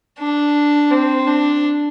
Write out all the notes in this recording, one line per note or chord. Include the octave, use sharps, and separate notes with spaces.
D4
C4
D4